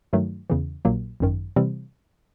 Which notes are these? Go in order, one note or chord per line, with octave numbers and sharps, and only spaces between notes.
G2 D#3 F#3 A3
E2 C#3 E3
A#1 A#2 F#3 A#3
G#1 F#2 D#3
C3 E3 G3 C4